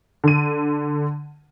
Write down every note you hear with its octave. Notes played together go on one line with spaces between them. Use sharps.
D3 D#7